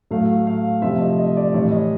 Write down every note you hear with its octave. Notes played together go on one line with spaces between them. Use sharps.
A2 F#3 A3 F5
F5
C3 F3 A3 C4 E5
D#5
D#5
D5
A2 E3 G3 C#5
D#5